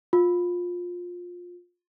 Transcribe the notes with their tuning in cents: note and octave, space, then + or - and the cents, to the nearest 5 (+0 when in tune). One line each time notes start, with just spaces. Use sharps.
F4 +20